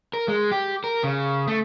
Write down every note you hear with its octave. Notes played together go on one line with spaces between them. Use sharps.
A#4
G#3
G4
A#4
C#3
A3